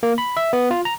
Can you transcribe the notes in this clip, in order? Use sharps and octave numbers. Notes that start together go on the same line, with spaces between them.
A#3
B5
E5
B3
F4
A#5